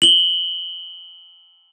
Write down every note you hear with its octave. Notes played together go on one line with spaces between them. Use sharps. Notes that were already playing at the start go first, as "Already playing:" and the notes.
F#7 G7